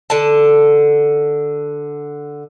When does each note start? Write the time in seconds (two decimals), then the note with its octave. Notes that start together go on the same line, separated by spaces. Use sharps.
0.10 D3 A5